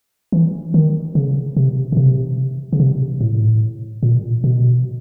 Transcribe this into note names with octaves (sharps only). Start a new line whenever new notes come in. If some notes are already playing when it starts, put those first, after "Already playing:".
E3
D#3
C#3
C3
B2
C3
C#3
C3
A2
A#2
B2